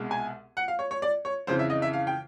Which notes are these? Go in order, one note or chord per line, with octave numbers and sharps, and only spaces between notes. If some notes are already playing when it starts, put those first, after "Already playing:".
Already playing: C2 B2 G#3
G#5
F#5
F5
C#5
C#5
D5
C#5
F2 C#3 E3 C5
E5
D#5
E5
F5
G5